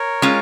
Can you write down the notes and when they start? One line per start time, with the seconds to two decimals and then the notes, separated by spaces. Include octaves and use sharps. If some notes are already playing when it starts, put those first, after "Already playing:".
Already playing: A#4 C#5
0.22 G#3 C#4 F4